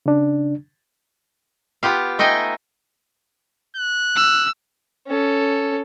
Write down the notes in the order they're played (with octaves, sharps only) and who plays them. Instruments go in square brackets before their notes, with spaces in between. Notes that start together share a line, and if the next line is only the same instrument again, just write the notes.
[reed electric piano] C#3 D4
[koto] B3 F4 G4 F5
A3 D#4 D#5 G5 G#5
[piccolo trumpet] F#6
[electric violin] E6
[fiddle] C#4 A4